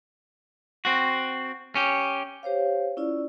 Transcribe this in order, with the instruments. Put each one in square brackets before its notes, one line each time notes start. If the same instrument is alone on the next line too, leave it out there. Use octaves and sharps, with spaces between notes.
[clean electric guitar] C4 F#4
C#4 G4
[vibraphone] G4 C5 C#5 F5
C#4 E4 F4 D5